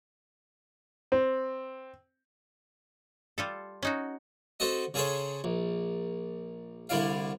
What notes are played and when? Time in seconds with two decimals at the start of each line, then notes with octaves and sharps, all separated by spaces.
1.12 C4
3.38 G3 F4 A4
3.83 C#4 D#4 F#4
4.60 C4 F#4 A4 D#5
4.94 C#3 G#4 A4 C5 C#5
5.44 A#1
6.89 C2 D3 E4 D5 F5